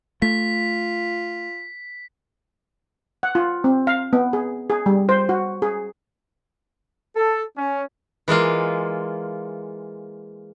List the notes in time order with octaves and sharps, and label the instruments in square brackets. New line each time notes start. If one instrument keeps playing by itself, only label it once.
[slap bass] A3 [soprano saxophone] F4 [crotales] B6
[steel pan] F#5
F4
C4
F5
B3
G#4
G#4
G3
C5
F#4
G#4
[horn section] A4
C#4
[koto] E3 G#3 A#3 F4